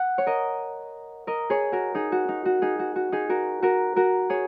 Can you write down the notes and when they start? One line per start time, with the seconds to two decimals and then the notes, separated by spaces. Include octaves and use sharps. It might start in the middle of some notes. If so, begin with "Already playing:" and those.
Already playing: F#5
0.18 C#5
0.27 A#4 D#5
1.27 A#4 D#5
1.50 G#4 C#5
1.72 F#4 A#4
1.95 D#4 G#4
2.12 F#4
2.29 D#4
2.45 F#4
2.62 D#4 G#4
2.79 F#4
2.96 F#4
3.12 D#4 G#4
3.29 F#4 A#4
3.62 F#4 A#4
3.96 F#4 A#4
4.30 G#4 C#5